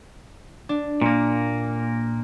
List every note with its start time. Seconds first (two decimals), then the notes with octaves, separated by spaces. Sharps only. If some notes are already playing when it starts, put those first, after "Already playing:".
0.69 D4
1.01 A#2 A#3